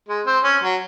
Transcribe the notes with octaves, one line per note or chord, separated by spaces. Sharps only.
G#3
C4
C#4
F#3